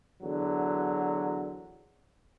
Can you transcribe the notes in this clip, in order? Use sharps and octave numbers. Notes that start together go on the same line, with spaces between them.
E2 D3 F#3